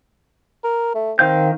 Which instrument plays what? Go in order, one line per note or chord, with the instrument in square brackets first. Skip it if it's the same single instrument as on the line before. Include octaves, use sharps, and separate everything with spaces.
[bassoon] A#4
A3
[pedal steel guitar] D#3 F5 G6 [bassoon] C4